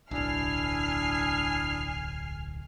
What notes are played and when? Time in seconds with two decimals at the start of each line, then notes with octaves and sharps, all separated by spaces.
0.11 D1 B1 D4 E4 G#4 G#5 F6 C7